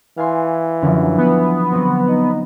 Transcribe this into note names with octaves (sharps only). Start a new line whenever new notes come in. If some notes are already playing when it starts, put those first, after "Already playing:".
E3 F5 G#5 C6
F#2 D3 F3 F#3
B3
F#3 C4
D#4